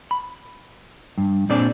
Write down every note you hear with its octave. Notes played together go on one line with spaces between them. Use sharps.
B5
G2
A#2 C4 D4 G#4 D5